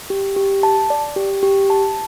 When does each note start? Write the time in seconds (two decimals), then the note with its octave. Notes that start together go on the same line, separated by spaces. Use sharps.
0.10 G4
0.36 G4
0.63 A5
0.90 D5
1.16 G4
1.43 G4
1.70 A5